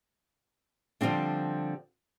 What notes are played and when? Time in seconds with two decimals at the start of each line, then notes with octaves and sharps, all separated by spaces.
1.01 D3 F3 G3 C4 D4